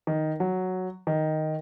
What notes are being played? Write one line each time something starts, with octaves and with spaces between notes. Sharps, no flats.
D#3
F#3
D#3